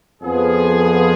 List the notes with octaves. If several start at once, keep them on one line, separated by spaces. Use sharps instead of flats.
F2 F3 B3 G#4